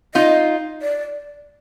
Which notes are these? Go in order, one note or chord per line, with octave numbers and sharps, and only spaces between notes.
D#4 F4 D#5
D5